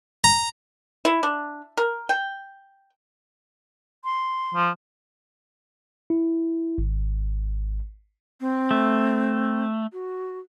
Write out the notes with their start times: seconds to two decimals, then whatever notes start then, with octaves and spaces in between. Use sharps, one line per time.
0.24 A#5
1.05 E4
1.23 D4
1.77 A#4
2.09 G5
4.04 C6
4.54 F3
6.10 E4
6.78 G#1
8.40 C4
8.71 A3
9.93 F#4